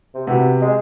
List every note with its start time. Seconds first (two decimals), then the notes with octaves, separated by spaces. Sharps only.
0.15 C3
0.27 C3 B3 F#4
0.62 G#3